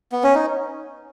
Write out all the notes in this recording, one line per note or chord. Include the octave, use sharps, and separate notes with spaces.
B3
C#4
D#4